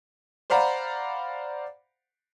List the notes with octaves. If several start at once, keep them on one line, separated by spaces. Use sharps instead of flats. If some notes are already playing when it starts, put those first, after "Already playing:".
C5 D5 F5 F#5 A#5 B5